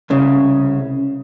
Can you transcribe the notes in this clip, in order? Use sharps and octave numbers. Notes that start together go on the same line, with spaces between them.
C2 C#3